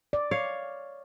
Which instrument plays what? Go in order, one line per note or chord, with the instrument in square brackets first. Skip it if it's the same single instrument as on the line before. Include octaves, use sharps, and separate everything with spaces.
[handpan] D5
[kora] C#5 F5